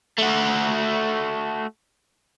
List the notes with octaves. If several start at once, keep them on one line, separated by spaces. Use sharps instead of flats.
A3 F#4